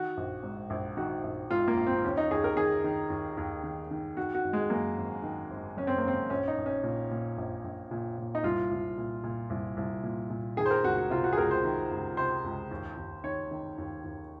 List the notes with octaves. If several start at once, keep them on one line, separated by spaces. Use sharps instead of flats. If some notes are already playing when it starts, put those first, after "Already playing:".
Already playing: D#3 F#4
A#1
G#2
A#1
D#3 F#4
A#1
G#2 F4
A#3
A#1
C4
D#2 C#4
D#4
D#2 G#4
A#4
D#3 G#4
D#3
D#2
D#2
D#3
D#3
D#3 F#4
F#4
G#1
G#3
F#2 A#3
G#1
D#3
G#1
F#2 C#4
C4
A#3
G#1 C4
A#1 C#4
D#4
A#1
C#4
A#2
A#2
A#1
A#1
A#2
A#2
D#4
C2 F4
C2
A#2
A#2
C2
C2
A#2
A#2
D#3 G#4
C5
A#4
C#2 F#4
F#4
C3 F4
F#4
G#4
C#2 A#4
C5
D#3
C#2
C3 C5
C#2
D#2
D#2
D#3 C#5
D#3
D#2
D#2